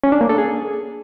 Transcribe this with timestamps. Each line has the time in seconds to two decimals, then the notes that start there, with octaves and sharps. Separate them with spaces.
0.04 C#4
0.12 D4
0.21 A#3
0.29 A4
0.38 G#4